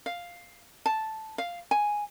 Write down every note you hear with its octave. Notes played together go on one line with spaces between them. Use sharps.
F5
A5
F5
G#5